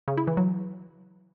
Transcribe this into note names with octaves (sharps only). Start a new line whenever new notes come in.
C#3
E4
E3
F#3